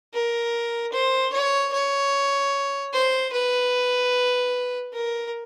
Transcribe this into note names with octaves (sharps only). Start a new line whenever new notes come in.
A#4
C5
C#5
C#5
C5
B4
A#4